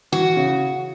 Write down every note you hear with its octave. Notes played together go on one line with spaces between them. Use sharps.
E3 F#4
C#3